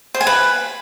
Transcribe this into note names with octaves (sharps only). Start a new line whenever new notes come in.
C5
G#5
B4